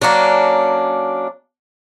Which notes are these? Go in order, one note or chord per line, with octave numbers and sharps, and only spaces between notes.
F#3 A#3 C#4 D4